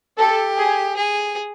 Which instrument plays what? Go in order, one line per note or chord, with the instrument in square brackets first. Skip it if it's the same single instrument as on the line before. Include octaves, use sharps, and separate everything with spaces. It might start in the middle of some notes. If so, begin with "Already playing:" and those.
[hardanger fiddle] G4 [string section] A4
[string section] G#4
[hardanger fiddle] G#4